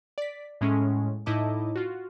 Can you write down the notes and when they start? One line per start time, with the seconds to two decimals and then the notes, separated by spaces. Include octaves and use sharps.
0.18 D5 B6
0.61 A2 G#3 C#4
1.26 A2 D#4 E4 D#5 A5 D6
1.75 F4 F#4